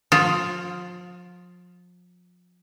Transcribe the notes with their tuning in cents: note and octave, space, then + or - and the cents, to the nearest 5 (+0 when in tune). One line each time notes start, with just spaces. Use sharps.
F3 +35 F4 +0